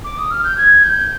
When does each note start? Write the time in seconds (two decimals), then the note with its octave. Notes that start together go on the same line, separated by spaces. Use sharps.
0.04 D6
0.18 D#6
0.31 F6
0.44 G6
0.57 G#6
0.84 G6